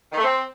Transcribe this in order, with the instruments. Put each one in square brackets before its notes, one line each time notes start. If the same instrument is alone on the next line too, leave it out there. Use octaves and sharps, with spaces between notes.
[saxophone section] D#3
A3
C4